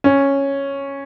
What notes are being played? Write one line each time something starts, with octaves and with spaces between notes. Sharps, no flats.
C#4